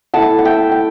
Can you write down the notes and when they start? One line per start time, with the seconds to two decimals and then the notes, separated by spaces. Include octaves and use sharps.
0.14 A3 E4 F#5 A5
0.39 F#5
0.45 E5 G5
0.72 G5